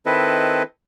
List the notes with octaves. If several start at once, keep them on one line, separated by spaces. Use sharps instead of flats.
D#3 C4 E4 A4 B4 D#5